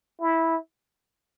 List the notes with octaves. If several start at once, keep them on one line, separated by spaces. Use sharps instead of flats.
E4